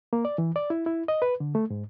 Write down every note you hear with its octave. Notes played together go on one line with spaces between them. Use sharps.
A#3
D5
E3
D5
E4
E4
D#5
B4
D3
A3
G#2